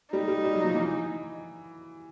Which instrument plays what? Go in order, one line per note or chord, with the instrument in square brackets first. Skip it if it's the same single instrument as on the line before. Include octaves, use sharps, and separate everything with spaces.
[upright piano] G3 [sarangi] D#4
[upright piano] G3
G3
F#3
F3
E3